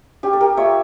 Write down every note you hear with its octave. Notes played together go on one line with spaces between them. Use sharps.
C#4 G4
A4
G4 A#4
F4 C#5 E5